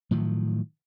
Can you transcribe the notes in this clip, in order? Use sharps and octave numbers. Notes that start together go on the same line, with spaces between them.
A2 D#3 F3 F#3